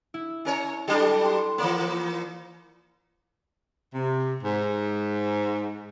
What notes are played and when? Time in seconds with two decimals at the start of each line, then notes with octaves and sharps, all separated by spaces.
0.14 E4
0.45 C#4 A#4 C#5
0.88 F#3 G3 D4 A4
1.25 C6
1.58 E3 A#3 B4 D5
3.95 C3
4.43 G#2